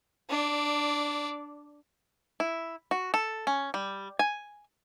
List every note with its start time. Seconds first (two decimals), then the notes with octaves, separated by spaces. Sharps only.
0.29 D4 D5
2.40 E4
2.91 F#4
3.14 A4
3.47 C#4
3.74 G3
4.19 G#5